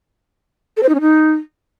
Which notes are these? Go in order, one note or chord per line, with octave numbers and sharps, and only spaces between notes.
A4
C5
D#4
C#4
D#4